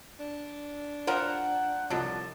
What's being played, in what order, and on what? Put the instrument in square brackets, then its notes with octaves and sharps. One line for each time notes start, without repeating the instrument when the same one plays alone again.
[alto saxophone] D4
[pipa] F3 G3 A#4 [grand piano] C5 [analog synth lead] F#5
[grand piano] C2 F3 D#5 [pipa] D3 F#3 [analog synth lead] A5